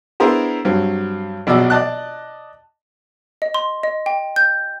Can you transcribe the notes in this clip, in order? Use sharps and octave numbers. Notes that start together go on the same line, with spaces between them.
B3 D4 E4 G#4 A#4 C5
G2 F#3 C4
A#1 B2 F#3 D5 E6
D5 D#5 A5 F#6
D#5
C6
D#5
G5
G6